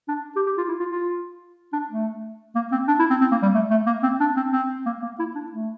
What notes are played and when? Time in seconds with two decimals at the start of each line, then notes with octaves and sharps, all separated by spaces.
0.08 D4
0.36 G4
0.46 G4
0.58 F4
0.68 E4
0.80 F4
0.91 F4
1.73 D4
1.90 A3
2.55 A#3
2.72 C4
2.88 D4
2.99 E4
3.10 C4
3.21 C4
3.31 A#3
3.42 G3
3.55 A3
3.71 A3
3.87 A#3
4.03 C4
4.20 D4
4.37 C4
4.52 C4
4.86 A#3
5.03 A#3
5.19 E4
5.35 D4
5.52 A3